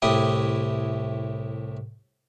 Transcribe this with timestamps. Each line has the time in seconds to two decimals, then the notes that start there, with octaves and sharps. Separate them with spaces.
0.02 C2 A2 E4 G4 G5 D#6